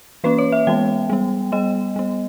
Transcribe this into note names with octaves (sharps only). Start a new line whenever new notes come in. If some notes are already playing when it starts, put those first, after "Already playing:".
E3 A#3 C#4 B4
C#5
E5
E3 G#3 B3 G5
G3 B3
G3 B3 D#5
G3 B3